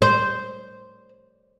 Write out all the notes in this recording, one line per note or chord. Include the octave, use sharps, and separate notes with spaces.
C5